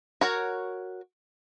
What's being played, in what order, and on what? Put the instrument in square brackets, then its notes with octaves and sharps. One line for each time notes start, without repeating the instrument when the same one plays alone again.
[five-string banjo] F#4 A#4 C#5